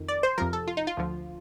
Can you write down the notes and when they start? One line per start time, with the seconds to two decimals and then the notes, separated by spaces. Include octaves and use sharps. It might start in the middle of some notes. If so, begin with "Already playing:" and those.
Already playing: F2 D#3
0.08 D5
0.23 C5
0.38 F2 C3 F3 A#4
0.53 A4
0.67 F4
0.77 D#4
0.87 F4
0.97 D2 D3 F3